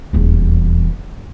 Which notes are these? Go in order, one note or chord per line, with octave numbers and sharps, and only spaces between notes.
D#1 E2